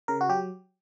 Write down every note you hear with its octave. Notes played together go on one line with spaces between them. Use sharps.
C#3 A#4
F#4
F#3 G4